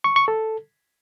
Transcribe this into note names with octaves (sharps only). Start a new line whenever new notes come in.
C#6
C#6
A4